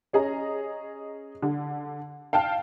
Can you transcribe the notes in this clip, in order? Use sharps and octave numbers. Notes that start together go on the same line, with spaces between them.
C#4 G#4 D#5 A#5
D3
F5 G5 A5 F6